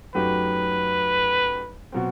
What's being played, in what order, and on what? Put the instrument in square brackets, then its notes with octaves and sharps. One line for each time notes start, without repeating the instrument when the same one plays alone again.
[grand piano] F#2 F#3 A3 D#4 G4 [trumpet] B4
[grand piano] B2 F#3 C4